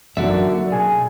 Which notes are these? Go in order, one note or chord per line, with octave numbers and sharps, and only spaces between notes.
F#2 D3 D#3 A#3 F#4 E5
B1 G#4